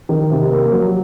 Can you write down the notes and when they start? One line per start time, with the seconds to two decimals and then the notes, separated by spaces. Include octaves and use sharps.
0.09 D#3
0.30 C3
0.51 A#3
0.72 F#3